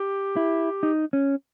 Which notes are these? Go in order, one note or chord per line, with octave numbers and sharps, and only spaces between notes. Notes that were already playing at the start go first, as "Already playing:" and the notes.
Already playing: G4
E4
D#4
C#4